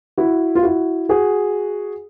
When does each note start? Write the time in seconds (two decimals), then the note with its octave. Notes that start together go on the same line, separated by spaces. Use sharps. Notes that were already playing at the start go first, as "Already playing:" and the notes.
0.17 E4 F#4
0.55 F4
0.63 E4 F#4
1.09 F#4 G#4